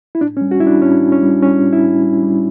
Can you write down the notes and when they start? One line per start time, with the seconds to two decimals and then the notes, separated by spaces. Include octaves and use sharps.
0.15 E4
0.21 A2 D4
0.37 C#4
0.41 G3
0.51 F#4
0.60 G3 E4
0.67 D4
0.82 A2 C#4
1.02 A2
1.12 C#4
1.22 G3
1.42 G3 C#4
1.62 A2
1.73 E4
1.82 A2
2.02 G3
2.23 G3